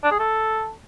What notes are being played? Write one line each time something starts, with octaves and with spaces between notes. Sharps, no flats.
D4
G#4
A4